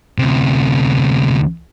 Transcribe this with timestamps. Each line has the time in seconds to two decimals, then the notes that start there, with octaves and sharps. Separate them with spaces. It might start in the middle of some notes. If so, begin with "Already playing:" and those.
0.18 D2 C3